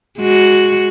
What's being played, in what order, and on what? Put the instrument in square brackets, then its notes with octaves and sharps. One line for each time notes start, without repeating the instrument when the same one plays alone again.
[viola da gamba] G#3 F#4